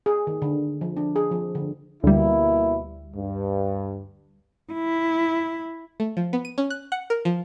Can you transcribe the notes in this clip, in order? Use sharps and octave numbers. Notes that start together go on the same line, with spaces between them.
G#4
D#3
D3
F3
D4
G#4
F3
D3
D2 B2 G3 A#3 E4
G2
E4
A3
F3
B3
D#7
C#4
F#6
F#5
A#4
F3